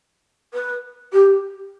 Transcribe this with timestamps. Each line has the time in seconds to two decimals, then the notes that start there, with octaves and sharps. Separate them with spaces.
0.54 B4
1.13 G4